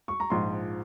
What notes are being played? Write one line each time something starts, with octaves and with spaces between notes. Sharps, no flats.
C#6
A#5
A#1 G#2 F3 C6